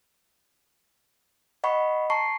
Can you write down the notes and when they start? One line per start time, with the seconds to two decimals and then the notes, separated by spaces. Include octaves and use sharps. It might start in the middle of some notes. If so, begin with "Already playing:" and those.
1.64 D#5 F#5 B5 C#6
2.10 A5 A#5 C#6 C7